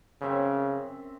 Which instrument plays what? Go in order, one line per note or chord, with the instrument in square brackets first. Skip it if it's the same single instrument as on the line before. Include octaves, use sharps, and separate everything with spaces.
[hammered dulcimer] F#2 C4 E5 [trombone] C#3